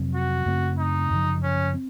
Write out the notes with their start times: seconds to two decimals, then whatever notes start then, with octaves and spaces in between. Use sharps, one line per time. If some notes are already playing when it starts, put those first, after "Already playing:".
Already playing: F2 C3 F#3 C4
0.14 F#4
0.46 F#2 C#3 A3 C4
0.78 D#4
1.10 F#2 C#3 F3
1.43 C#4
1.74 C4